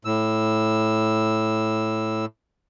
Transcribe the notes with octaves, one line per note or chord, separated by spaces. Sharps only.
A2 E6